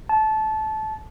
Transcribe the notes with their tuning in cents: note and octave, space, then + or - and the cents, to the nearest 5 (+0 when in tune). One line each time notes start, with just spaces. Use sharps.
A5 -20